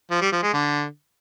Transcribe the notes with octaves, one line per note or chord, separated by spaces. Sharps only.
F3
G3
F3
G#3
D3